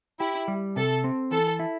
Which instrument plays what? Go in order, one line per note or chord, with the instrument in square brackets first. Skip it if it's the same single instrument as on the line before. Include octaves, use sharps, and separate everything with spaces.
[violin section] E4 [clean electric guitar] G4
[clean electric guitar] G3
[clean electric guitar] C3 [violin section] A4
[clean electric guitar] C4
[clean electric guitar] E3 [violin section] A4
[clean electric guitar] E4